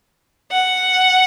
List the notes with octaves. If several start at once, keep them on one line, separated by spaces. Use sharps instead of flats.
F#5